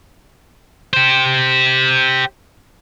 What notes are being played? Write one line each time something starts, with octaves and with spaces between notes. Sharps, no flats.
G4 C5